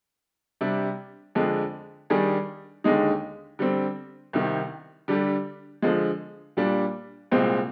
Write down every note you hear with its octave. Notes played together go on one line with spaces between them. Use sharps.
C3 G3 D4
F2 D3 G#3 D4
D#3 G3 D4 G#4
D#2 D3 G#3 D#4
D3 G3 C4
C2 C3 D#3
D3 G3 D4 G4
D3 F3 G#3
A#2 G3 D4
C2 A#2 G#3 C4